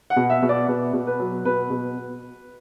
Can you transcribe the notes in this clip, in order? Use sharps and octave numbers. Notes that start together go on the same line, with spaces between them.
F#5
B2
E5
B2
D5
B2 B4
B2
B4
F#3
B2 B4
B2